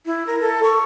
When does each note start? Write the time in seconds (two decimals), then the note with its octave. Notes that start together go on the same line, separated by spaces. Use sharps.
0.06 E4
0.27 A#4
0.40 A4
0.64 C#6